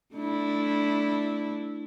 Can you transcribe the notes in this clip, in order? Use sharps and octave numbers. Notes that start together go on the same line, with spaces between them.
A3 D4 E4